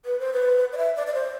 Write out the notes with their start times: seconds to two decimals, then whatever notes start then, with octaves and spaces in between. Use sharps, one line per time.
0.05 B4
0.20 C5
0.33 B4
0.73 D5
0.78 E5
0.96 D5
1.07 D5
1.14 C5